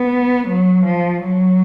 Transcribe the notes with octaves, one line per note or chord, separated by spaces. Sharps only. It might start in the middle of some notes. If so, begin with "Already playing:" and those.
Already playing: B3
F#3
F3
F#3